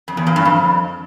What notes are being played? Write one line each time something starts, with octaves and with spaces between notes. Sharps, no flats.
F2
E2
A#2
G2
F2